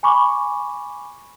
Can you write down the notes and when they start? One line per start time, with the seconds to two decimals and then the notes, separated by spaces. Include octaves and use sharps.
0.03 G#5 B5 C#6 D6